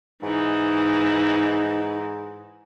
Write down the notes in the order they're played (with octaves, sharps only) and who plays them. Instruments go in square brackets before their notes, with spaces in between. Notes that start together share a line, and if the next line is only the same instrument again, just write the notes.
[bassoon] G#2 [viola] E3 D#4